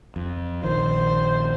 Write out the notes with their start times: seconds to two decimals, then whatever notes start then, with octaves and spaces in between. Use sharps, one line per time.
0.16 F2
0.64 A#1 D#3 C5